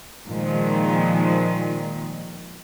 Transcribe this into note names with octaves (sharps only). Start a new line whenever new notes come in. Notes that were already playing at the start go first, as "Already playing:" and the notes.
A#2 D#3 F3 G#3